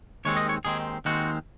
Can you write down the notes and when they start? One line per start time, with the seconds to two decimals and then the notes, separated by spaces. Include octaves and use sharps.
0.25 D#2 D#3 G#3 C4 C#5
0.37 D#5
0.49 C#5
0.65 D#2 D#3 G#3 C4 G#4
1.05 D#2 D#3 G#3 C4 F#4